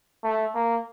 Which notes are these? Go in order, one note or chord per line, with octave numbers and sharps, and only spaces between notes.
A3
A#3